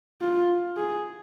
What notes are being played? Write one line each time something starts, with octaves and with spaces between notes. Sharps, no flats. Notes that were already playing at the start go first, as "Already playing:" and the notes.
F4
G#4